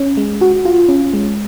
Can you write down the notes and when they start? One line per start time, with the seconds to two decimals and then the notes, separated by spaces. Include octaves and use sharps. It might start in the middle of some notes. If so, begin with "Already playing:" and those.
Already playing: C#4
0.17 G#3
0.41 F#4
0.65 F4
0.88 C#4
1.13 G#3